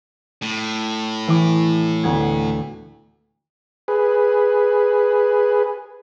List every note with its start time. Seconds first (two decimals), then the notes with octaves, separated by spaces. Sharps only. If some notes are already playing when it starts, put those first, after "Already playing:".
0.42 A2
1.27 E3 E4 D6
2.03 D2 B3 G#6
3.88 G#4 B4